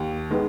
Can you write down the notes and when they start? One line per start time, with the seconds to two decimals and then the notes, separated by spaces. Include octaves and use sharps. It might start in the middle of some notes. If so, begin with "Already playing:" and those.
Already playing: D#2
0.30 D#3 G#3 B3